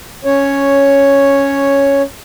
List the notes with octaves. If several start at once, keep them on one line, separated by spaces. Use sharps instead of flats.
C#4 C#5